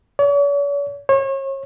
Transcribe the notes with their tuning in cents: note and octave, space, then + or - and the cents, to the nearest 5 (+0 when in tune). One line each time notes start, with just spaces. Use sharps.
C#5 +45
C#5 -35